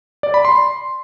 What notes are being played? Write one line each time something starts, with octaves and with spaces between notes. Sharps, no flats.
D5
B5
C6